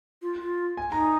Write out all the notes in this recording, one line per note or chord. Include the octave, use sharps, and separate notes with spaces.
F4
F4
G#5
D#4 A#5